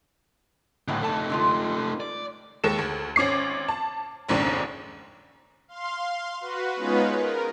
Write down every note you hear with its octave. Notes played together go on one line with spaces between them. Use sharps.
A2 D3 G#3 B3 E4
D3 A3 D#4 A5
D3 G#3 F4
D5
D#2 G#3 A4 E7
D2
G#1 C#4 D6 C7
A5
F1 A#1 D#2 G#2 C#3 D4
F5 C6
F#4 B4
G#3 B3 C#4 D#4 F4 B4
A#4